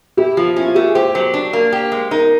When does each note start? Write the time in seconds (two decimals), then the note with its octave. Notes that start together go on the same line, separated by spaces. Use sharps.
0.17 E4 G4
0.37 F3 F4
0.56 C#4 E4
0.67 F4
0.75 A3 G4
0.85 G#4
0.95 G4 C5
1.14 F#3 C5
1.34 D4
1.53 A#3
1.72 G4
1.92 G#3
2.11 D#4 A#4